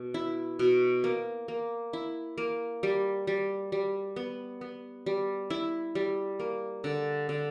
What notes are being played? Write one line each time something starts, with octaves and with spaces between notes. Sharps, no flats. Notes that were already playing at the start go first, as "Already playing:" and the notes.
Already playing: B2
E4
B2
A#3
A#3
E4
A#3
G3
G3
G3
B3
B3
G3
E4
G3
A#3
D3
D3